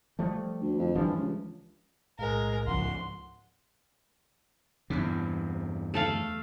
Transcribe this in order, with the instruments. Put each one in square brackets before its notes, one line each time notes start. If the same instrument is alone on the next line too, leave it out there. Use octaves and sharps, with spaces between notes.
[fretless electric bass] F3 G3 A3
[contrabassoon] D2
F2
[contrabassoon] G2 [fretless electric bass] E3 F3
[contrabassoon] C#2
[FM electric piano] B1 A2 F5 [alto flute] G#3 [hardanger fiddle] A#4
[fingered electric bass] C#2 G#2 F3 [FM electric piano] F5 [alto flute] F#5 [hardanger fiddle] C6
[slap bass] E2 G2 C3
[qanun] A3 A4 F5